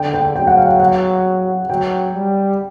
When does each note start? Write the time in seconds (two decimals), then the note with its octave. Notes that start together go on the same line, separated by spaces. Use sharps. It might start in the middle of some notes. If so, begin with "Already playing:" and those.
Already playing: D3 G5
0.14 G5
0.35 F#3 G5
0.47 F#5
0.57 F5
0.69 F#5
0.80 F#5
1.69 F#3 G5
2.14 G3